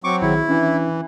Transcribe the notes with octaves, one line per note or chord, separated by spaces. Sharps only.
F#3 C4 C#6 D6
A#1 D#3 E4 G#4
E3 C#4 D4 E5